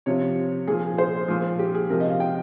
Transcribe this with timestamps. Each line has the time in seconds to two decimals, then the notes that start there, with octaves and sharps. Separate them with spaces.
0.06 C3 F3 C#5
0.67 A#2 F3 G#4
0.98 C5
1.28 A#2 F3
1.59 G4
1.75 G#4
1.90 C3 F3 A#4
2.00 D#5
2.10 F5
2.20 G5